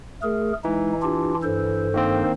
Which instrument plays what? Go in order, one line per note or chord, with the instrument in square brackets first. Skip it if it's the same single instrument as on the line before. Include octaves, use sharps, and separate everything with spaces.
[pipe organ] A3 G#4 A#4
[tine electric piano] E3 [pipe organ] G#3 D#4
[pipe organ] D4 F4 G4
G2 A4 C5
[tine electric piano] D#3 A#3 C4